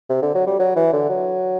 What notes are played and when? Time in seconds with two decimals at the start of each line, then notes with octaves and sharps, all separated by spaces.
0.09 C3
0.22 D3
0.34 F#3
0.46 G3
0.59 F#3
0.76 E3
0.93 D3
1.09 F#3